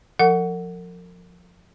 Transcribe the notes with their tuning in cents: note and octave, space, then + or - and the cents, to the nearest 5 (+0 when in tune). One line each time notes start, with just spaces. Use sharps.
F3 +20 A#4 -45 F#5 +0